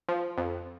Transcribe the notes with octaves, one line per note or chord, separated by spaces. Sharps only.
F3
F2